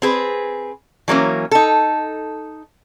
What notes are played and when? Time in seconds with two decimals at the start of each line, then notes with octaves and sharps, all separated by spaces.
0.02 C4 G#4 B4
1.08 E3 F#3 A#3 C#4
1.51 D#4 A4